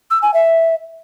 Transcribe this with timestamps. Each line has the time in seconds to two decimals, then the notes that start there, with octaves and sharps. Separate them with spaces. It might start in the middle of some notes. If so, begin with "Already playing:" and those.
0.10 E6
0.22 G#5
0.34 E5